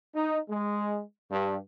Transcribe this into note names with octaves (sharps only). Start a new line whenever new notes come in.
D#4
G#3
G2